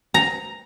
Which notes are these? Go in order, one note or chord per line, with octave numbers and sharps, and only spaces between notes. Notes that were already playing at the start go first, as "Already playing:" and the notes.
A#5